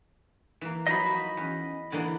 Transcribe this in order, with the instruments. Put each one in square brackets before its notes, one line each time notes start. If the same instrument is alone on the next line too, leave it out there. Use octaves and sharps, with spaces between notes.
[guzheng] E3 A#3
[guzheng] F3 F#3 D#4 [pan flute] F#4 [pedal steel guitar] D#5 B5
[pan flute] F#4
[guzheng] E2 [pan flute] C#4
[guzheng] D3 E3 A#3 [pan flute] E4